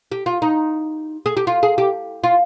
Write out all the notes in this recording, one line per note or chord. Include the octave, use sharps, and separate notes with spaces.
G4
F4
D#4
G#4
G4
F4
G#4
G4
F4